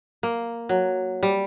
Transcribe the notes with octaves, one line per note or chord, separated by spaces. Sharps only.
A#3
F#3
G3